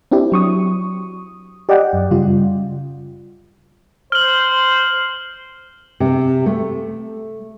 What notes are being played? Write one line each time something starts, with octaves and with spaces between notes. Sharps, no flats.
C4 D4 E4 G4
F#3 C#6 D#6
G4 D5 D#5 F#5 G5
F#2
C#3 G3 F4
C5 F6 F#7
C3
A3